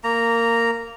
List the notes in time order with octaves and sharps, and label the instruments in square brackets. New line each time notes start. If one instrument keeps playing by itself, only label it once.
[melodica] A#3 A#5